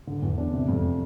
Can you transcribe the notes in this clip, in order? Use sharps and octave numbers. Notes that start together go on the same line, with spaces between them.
D3
E2
D4
C3
F2